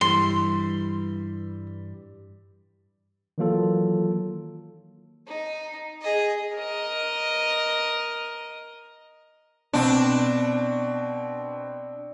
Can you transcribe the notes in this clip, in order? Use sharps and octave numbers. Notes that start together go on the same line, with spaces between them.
G2 E3 G3 C6
D#3 E3 F#3 A#3 F4 A4
D#4
G#4 D#5
A#4 D#5
B2 C4 D4